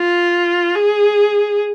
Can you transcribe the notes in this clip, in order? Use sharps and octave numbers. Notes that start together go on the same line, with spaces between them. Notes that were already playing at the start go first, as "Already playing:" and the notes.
Already playing: F4
G#4